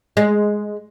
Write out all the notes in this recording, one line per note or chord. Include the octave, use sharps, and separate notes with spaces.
G#3